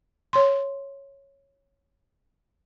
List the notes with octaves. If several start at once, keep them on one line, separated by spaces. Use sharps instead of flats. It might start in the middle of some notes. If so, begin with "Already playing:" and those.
C#5 C6